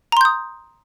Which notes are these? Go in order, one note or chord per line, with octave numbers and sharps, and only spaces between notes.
A#5 C6 D#6 G6